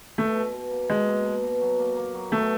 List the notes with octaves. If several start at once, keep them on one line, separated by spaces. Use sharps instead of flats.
B2 A3
B2
B2
A#3
B2 G#3
A#3
B2
B2
F#3
A#3
A#3
F#3
B2 A3